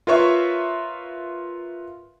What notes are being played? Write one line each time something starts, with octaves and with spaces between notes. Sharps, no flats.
F4 A#4 B4 C#5 E5 C#6